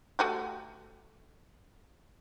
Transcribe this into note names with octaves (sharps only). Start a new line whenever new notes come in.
A3 F#4 G4